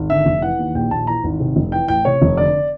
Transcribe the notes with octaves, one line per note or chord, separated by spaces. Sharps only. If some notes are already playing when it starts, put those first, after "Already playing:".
Already playing: G#1
D3 E5
F1
E3 F#5
D#2
A#1 G5
A#1 A5
E3 A#5
G#1
C3
F1
E3 G5
A1 G5
C3 C#5
F1
D3 D5